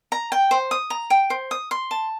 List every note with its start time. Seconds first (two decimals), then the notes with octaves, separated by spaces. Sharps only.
0.12 A#5
0.32 G5
0.51 C5
0.71 D#6
0.90 A#5
1.10 G5
1.30 C5
1.51 D#6
1.71 C6
1.91 A5